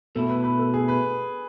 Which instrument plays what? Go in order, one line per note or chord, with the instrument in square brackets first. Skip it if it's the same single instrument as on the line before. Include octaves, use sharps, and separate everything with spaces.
[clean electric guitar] B2 A3 E4 [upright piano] A4
[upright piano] B4
B4
A4
G#4
B4